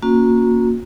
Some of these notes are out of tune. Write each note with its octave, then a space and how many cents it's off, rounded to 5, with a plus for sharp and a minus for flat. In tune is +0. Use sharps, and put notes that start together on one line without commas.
A#3 +0 C#4 +0 F#4 -35